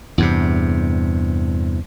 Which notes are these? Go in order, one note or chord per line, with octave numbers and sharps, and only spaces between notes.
E2 G2 C3